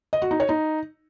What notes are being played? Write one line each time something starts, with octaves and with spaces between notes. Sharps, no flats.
D#5
F#4
D#4
C#5
D#4